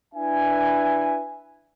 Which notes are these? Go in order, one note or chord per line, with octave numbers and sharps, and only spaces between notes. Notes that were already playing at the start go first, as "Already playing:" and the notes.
D4 E4 B4 E5 G#5